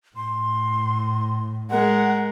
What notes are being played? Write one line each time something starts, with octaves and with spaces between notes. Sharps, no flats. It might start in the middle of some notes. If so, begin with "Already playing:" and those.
A2 C6
G#3 A#4 F#5